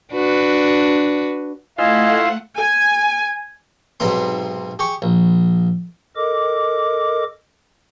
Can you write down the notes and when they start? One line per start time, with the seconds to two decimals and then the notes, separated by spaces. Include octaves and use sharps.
0.13 D4 F#4 B4
1.78 A3 E4 F4 C5 D#5 F5 F#5 G#5
2.55 G#5
4.00 B1 G#2 C3 B3 C4 C6
4.79 G4 G#4 C#6
5.02 A#1
6.16 A4 A#4 D#5 D6